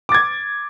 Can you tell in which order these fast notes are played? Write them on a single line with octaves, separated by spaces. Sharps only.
D6 A6 G#6